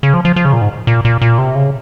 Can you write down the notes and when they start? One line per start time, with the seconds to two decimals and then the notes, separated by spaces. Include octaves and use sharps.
0.03 C#3
0.14 F3
0.25 F3
0.36 F3
0.45 C#3
0.53 A#2
0.61 G#2
0.87 A#2
1.05 A#2
1.22 A#2
1.38 C3
1.55 C#3